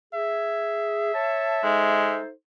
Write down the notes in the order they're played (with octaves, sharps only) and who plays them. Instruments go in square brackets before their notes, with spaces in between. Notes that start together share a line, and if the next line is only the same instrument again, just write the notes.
[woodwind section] G#4 [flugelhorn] E5
[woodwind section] C#5 A5
[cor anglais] G#3 [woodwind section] D#4 A4 C5